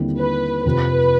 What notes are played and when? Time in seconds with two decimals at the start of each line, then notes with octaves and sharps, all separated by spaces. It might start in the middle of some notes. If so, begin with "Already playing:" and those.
Already playing: D#2 D3 G3 C4 E4
0.18 B4
0.65 F2 C3 F3 B4